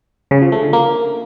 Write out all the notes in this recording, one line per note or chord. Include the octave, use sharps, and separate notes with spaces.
C#3
F3
A3
D3
A#3